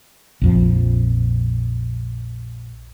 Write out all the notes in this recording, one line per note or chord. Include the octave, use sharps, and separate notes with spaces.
A#1 F2 F3